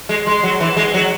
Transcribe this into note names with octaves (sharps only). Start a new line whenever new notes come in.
G#3
G#3 C6
F#3
E3
G#3
F#3